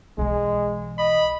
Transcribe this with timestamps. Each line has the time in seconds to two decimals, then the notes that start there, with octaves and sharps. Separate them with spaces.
0.18 B1 E3 G#3
0.99 D#5 B5